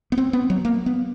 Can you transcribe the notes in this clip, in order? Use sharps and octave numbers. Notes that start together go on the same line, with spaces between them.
B3
C4
B3
F#3
A#3
B3